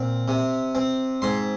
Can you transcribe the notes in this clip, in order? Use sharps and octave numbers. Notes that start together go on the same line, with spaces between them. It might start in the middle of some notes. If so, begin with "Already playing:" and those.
Already playing: A#2 C4
C3
C4
G#2 C6